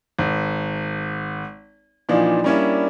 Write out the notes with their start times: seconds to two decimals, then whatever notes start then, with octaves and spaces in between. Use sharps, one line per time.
0.18 G#1
2.09 A#2 E3 F3 D4 D#4
2.44 G3 A#3 C#4 D4 E4